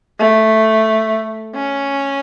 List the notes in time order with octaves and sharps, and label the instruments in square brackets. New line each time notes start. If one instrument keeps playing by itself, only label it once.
[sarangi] A3
C#4